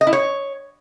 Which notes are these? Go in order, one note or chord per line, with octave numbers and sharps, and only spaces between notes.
D#5
E4
C#5